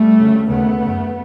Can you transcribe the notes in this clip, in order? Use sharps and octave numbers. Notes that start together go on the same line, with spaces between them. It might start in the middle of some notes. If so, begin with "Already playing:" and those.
Already playing: G3 A3
D2 C#3
D#2 C#3 A3 B3
F#2 C#3